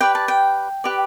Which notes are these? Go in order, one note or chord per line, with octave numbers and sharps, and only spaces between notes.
G4 B4 D5 G5
A5
G5
G4 B4 D5